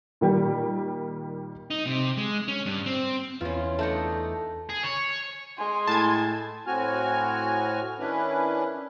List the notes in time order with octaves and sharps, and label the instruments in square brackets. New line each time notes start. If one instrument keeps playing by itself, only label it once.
[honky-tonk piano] A#2 D#3 G3 G4
[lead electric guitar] D#4
C3
G#3
C#4
G2
C4
[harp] E2 [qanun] C#4 F4
[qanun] A3 D4 D#4 [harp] A5 G6 C#7
[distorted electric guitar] G#4
C#5
[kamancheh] G#3 G#5 [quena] C6
[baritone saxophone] A2 [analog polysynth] A5 G#6
[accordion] A2 C4 F#4 G#5 F6
D#3 C#4 D4 E4 B4